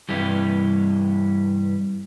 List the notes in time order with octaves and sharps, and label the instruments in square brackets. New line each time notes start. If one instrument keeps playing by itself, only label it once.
[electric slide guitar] G2 E3 G3 G4